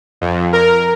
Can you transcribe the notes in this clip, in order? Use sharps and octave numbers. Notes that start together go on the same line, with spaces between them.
F2
A#4